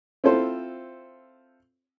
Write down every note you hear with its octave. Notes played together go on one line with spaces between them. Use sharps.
C4 E4 F4 A4 C5